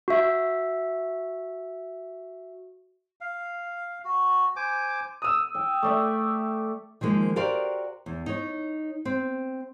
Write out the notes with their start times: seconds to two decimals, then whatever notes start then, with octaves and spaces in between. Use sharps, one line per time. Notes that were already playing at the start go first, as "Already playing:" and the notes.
0.08 F#4 E5
3.21 F5
4.05 F#4
4.56 C5 G#5 D6
5.22 D#6 E6
5.55 G5
5.83 A3 D5 E5
7.01 D#3 F3 G#3 A#3 C5
7.36 F#4 G4 A#4 C5 D5 F5
8.06 E2
8.26 D#4 C#5
9.05 C4